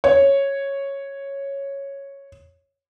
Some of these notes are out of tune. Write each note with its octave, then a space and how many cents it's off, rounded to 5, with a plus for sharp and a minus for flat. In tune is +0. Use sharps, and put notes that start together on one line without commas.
C#5 -5